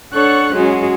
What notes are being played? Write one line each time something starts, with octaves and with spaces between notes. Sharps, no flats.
D4 A4 C#5 F#5 C#6 F#6
F#3 G#3 C#4 F#4 G#4